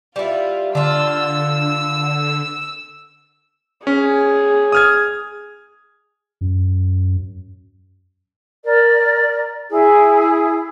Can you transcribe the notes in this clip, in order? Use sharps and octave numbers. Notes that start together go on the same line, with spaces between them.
G3 E4 F4
D3 D4 F4 E6
C#4 G#4
D#6 F6 G#6
F#2
A#4 D5
E4 G#4